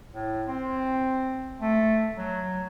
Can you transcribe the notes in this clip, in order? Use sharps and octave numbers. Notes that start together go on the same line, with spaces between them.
A2
C4
A3
F#3